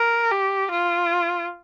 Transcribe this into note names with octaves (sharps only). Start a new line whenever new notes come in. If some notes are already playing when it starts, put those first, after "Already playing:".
Already playing: A#4
G4
F4